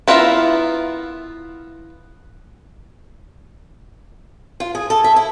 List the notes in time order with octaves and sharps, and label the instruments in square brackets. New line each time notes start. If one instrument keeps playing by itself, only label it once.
[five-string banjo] B3 E4 F4 A#4 E5
[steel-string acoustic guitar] F4
G#4
A4
E5
E4